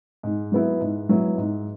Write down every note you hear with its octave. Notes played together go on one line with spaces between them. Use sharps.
G#2
F#3 B3 E4
G#2
F#3 B3 E4
G#2